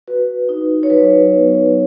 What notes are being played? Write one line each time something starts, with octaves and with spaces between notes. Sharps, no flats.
F#4 B4
D#4
C#5
F#3 B4
B3